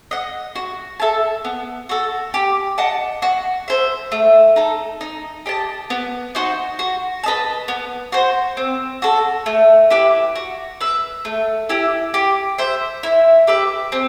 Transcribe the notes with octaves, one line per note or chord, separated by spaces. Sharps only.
D#5 F#5
F#4
A4 E5 A5
B3
F#4 A4
G4
D#5 F#5 A5
F#4
C5 E5
A3
D#4 A4
D#4
G4 D#5 A5
B3
D#4 F#4 C5
F#4
B4 D#5 A5
B3
F#4 C5
C4
F#4 A4
A3
E4 G4 B4
F#4
B4 E5
A3
E4 G4
G4
C5 E5
E4
G4 B4 E5
C4